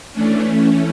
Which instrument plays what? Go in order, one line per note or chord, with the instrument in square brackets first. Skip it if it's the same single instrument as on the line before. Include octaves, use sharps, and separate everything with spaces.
[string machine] E3 A3 C#4 D4